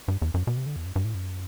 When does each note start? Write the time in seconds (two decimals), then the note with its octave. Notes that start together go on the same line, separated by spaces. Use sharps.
0.08 G2
0.22 E2
0.34 F#2
0.47 B2
0.57 C3
0.66 D3
0.76 E2
0.85 F#2
0.96 G2
1.05 A2
1.14 F#2